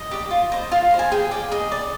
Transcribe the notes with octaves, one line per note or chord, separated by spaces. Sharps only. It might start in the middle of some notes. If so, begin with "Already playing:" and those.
Already playing: D#5
G4 D5
F4
C5 D#5
F4 F5
D#5
C5
G#5
G#4 G5
D5 G5
G#4 D#5
D5